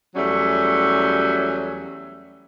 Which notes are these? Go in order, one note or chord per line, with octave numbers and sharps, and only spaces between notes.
E2 F#3 G3 A3 C#4